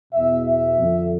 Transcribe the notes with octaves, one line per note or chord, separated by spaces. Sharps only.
E2 B2 E5
E5
F2 D3